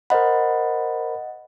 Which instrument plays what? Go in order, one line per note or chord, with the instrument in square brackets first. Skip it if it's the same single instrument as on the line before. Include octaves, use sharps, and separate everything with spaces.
[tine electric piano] A#4 C5 B5 [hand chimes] D#5 F#5